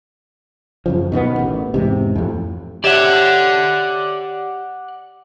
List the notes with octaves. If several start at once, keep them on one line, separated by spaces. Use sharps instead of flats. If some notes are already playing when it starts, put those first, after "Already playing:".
F#2 C#3 F3
B2 D#3 G#3 B3
A1
E2 G#2 C3
F2 A2
G4 C#5 D5 E5 F#5